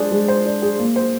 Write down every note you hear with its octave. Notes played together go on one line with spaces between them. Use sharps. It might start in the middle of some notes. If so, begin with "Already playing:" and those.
Already playing: G#3 D4 G#4 C5
G#3
C5
D4
G#4
A#3
C5